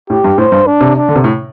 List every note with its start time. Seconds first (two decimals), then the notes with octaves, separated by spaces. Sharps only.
0.10 A2 G4
0.24 G2
0.38 A2 C5
0.52 G2
0.67 D4
0.81 C3
0.96 D4
1.09 D3
1.16 C3
1.24 A2